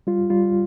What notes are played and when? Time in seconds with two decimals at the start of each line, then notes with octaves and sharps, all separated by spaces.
0.07 G3 F4
0.30 G3 F4